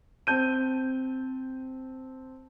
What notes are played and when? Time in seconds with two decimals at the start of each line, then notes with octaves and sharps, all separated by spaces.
0.27 C4 A5 G6 D#7